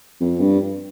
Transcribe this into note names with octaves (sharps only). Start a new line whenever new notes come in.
F2
G2